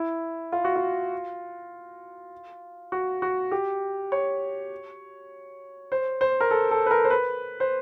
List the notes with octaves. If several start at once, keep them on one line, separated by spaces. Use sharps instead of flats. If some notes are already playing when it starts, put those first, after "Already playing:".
Already playing: E4
F4
F#4
F4
F#4
F#4
G4
C#5
C5
C5
A#4
A4
A4
B4
A#4
C5
B4
C5